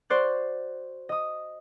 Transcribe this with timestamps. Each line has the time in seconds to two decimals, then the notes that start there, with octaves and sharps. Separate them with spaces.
0.10 F#4 C5 D5 F#6
1.09 D#5 D#6